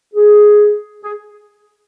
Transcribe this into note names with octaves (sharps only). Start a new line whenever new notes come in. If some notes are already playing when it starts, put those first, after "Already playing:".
G#4
G#4